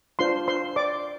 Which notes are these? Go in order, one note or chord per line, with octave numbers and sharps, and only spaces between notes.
D4 F4 C5 C6
C5 C6
D5 D6